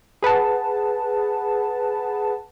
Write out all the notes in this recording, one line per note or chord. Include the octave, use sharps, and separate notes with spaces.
G#4 B4 F#5 A5